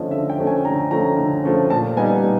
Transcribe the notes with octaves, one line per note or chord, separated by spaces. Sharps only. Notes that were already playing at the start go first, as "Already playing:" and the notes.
Already playing: D3 F3 A3 C#4 D#5
D3 E5
G5
F3 A3 C#4
G#5
D3 A#5
F3 A3 C#4 A#5
D3
F3 A3 C#4
A#2 A5
G3 B3 D#4 G#5
A#2